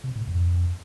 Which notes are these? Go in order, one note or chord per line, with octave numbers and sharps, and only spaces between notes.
C3
A2
F2